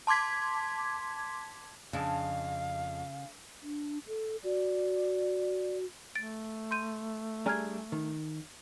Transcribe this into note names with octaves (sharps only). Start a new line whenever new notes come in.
A5 C6 D6 G#6 B6
F2 C#3 D4 F5
D4
A4
F#4 D5
A3 A6 D7
C6 G6 D#7
G3 D4 G#4 A#5 F6 G#6
D#3